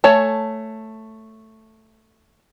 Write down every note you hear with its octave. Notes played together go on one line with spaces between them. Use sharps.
A3 C#5 G#5 A5